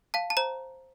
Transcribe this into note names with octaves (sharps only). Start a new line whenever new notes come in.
F5 A5
A5
C5 A#5